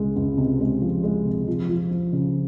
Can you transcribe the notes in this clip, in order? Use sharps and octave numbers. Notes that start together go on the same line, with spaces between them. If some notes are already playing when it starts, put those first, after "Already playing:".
Already playing: C#2 G#3
C#2
C3
G#3
F3
G#3
C3
F3
F3
F3
C#3